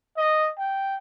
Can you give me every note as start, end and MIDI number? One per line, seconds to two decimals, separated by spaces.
0.17 0.51 75
0.58 0.98 79